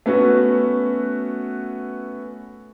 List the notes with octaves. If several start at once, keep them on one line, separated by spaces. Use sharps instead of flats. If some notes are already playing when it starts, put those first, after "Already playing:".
A3 B3 C#4 F#4